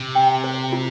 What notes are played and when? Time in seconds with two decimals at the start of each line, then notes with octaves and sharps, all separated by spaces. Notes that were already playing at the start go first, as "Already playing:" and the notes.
Already playing: C3
0.15 G5
0.44 C5
0.73 F4